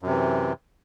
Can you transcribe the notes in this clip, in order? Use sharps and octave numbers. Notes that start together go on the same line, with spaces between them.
F#2 C3 E3